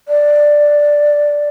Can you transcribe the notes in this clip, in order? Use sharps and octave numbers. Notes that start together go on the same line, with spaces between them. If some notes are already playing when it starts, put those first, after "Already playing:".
D5